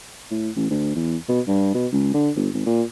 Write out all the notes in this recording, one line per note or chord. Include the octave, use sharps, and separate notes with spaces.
A2
A1
D2
E2
B2
G2
B2
C#2
D3
G1
G#1
A#2